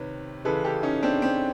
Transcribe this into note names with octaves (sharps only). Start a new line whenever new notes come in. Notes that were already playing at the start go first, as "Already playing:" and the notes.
Already playing: C3 D#3 B4 C#5
C#3 E3 G#3 A4 B4
G4 A4
C#4 D#4
C4 D4
C4